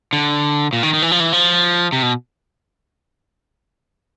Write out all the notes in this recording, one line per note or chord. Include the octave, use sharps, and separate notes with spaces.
D3
A#2
D#3
D#3
E3
F3
E3
F3
C3
B2